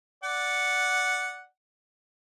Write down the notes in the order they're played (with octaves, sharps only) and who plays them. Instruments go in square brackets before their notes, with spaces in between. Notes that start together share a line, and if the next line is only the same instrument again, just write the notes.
[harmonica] D5 F#5